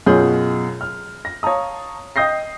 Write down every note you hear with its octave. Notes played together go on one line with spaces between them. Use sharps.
F#2 B2 F4 G#4 C#5 G6
F6
A#6
C#5 F5 A5 A#5 D#6
D#5 G5 D#6 G6 A#6 C7